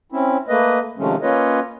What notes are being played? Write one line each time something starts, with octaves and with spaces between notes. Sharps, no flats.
C4 C#4 E4
A3 A#3 B4 D#5
C3 D#3 F3 G#3 A3 C#4
A#3 C#4 F4 B4 C#5 D#5